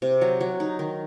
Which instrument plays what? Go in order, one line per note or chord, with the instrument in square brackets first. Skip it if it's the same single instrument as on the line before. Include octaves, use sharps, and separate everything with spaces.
[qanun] C3
F#3
F#3
D#4
D#3